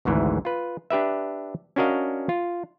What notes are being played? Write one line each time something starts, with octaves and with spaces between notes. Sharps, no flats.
G#1 D2 G#2 E3
F4 B4
D4 G4 B4 E5
C#4 D4 F#4 A#4 D#5 F5
F4